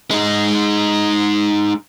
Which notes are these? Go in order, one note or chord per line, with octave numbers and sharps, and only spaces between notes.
G#3 D#4